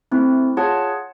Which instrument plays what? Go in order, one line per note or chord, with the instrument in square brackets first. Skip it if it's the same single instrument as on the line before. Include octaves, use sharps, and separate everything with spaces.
[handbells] A3 C4 E4
F4 G#4 C#5 F#5 A5